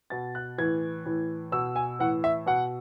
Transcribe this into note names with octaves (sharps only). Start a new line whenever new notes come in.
B2 A6
F#6
A2 E3 G#6
A2 E3
B2 E6
G#5
A2 E3 F#5
E5
B2 F#5